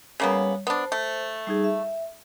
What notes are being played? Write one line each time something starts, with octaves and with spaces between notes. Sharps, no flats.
C#3 G3 A#3 B3 C#5
B3 D4 C5
A3
G3 D#4 G#4
E5